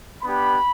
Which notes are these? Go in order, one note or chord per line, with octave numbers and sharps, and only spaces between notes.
B3 D4 G4 B5